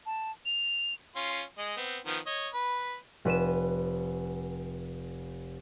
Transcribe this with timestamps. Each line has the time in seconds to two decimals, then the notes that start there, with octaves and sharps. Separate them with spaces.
0.06 A5
0.46 F7
1.16 C#4 F4 C6
1.58 G#3 D#5
1.77 B3 C4
2.06 D#3 F3 B3
2.26 C#5 D#5
2.54 B4
3.25 F1 B4 D#7 E7